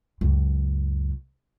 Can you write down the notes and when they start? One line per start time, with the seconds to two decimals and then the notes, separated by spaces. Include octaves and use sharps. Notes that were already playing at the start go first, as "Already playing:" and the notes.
0.21 C#2 F#2